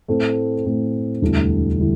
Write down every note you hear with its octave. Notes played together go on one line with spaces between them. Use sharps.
A2 A3 C4
A2 A3 C4
E1 D2 D3 G3 E4
D3 G3 E4